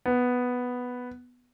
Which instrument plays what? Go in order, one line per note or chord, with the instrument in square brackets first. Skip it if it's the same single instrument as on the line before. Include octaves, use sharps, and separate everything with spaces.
[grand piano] B3